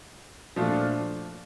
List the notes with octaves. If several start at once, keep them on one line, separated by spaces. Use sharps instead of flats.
A#2 F3 A3 D4 F4